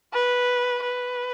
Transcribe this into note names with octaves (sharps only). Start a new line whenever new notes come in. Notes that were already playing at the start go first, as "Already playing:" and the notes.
B4
B4